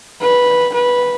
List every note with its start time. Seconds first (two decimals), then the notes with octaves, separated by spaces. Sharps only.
0.21 B4
0.74 B4